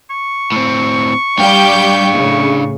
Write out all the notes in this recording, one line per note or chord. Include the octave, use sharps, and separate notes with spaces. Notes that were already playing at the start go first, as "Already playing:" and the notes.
C#6
A2 C4
G3 D4 G4 F5 G6
A2 C#3